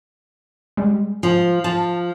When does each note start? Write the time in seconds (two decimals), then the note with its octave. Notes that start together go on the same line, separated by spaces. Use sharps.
0.77 G3 G#3
1.23 F3
1.64 F3 A5